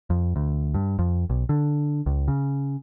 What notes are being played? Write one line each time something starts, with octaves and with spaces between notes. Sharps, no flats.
F2
D2
G2
F2
B1
D3
C#2
C#3